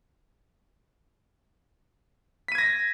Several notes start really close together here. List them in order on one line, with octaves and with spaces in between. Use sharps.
B6 D#7 G#6 A#6